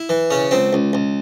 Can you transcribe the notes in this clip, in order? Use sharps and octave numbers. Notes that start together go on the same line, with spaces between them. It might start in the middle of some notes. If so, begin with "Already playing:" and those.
Already playing: E4
E3
C#3 C#4
C#2 C4
C#2
C#2